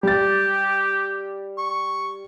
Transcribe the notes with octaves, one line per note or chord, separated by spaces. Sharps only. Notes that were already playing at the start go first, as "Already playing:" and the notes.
G3 G4 A6
C#6